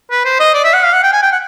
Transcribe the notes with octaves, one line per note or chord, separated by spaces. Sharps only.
B4
C5
D#5
D5
E5
F#5
F5
F#5
G5
G#5
G5
F#5